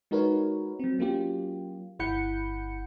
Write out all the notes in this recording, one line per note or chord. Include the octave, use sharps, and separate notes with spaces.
G#3 D#4 F#4 A#4 B4 C#5
F#3 C4
F#3 A#3 C#4 F4 G4
G1 E4 F#5 B5 G6 C#7